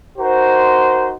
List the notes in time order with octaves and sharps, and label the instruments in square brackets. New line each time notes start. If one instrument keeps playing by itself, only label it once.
[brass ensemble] D#4 F#4 A#4 C5